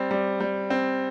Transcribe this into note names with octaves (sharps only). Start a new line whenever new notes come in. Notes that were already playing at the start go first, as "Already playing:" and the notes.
Already playing: G3 C4
G3
G3
C4